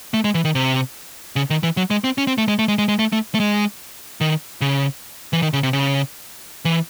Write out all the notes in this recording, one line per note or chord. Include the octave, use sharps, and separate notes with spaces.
A3
G#3
E3
D#3
C3
C#3
D#3
E3
F#3
G#3
C4
C#4
C4
A3
G#3
A3
G#3
G#3
G#3
A3
A3
A3
G#3
D#3
C#3
E3
D#3
C#3
C3
C#3
E3